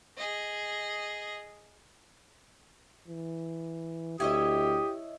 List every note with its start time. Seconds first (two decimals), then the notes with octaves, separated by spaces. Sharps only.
0.17 G#4 D#5
3.08 E3
4.20 D2 E4 G4 C#5 D#5 D#6